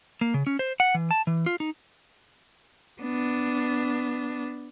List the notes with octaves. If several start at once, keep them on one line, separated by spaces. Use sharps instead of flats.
A#3
C#3
C#4
C5
F#5
E3
A5
E3
F4
D#4
B3 D4